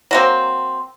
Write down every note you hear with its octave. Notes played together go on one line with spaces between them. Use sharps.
F#3 A#3 C4